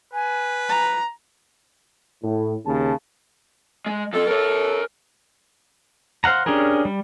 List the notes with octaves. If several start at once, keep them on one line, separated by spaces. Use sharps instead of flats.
B4 G#5
A#5
A2
D#2 C#3 A5
G#3
F3 C4 A4
A#4 C#5
C5 F5 F#5 A#5
C#4 D4 G4 G#4 A#4
G3